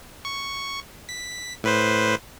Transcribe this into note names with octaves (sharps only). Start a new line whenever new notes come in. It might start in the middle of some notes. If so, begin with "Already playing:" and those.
C#6
B6
A2 B4 C5